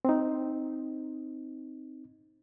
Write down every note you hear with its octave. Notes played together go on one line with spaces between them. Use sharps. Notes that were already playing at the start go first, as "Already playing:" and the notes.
C4 D#4